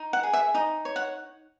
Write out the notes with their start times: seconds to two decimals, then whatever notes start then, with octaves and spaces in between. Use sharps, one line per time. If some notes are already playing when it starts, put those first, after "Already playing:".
Already playing: D#4
0.13 F#5
0.23 G#4
0.33 E5
0.54 D#4 D#5
0.85 C#5
0.96 F#5